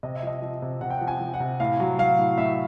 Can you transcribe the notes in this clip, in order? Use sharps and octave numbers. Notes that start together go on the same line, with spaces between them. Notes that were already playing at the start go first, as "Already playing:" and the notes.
C3 D#5
E5
F3 D#5
F3
C3
C3 F#5
G5
F3 F#5
G#5
F3
F#5
C3
A2 F5
F#3
F#3 F5
A2
A2 E5